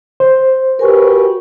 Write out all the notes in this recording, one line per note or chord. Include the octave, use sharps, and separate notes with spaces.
C5
F#4 G4 A#4 B4 G#5 C#6